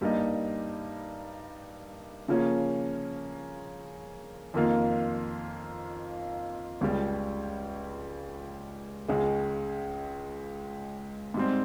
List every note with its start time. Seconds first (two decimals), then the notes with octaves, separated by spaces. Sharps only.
0.01 G2 G3 A#3 D#4
2.28 C#3 F3 A#3 C#4
4.54 F2 D#3 A#3 F4
6.81 C#2 C#3 G3
9.08 C#2 C#3 G#3
11.34 G#2 G3 C4